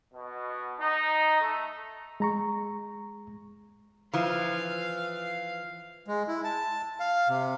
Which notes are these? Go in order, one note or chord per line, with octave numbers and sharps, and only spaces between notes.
B2
D#4
A3
G#3 A#5 C#6
E3 F3 F5
G#3
E4
A5
F5
C3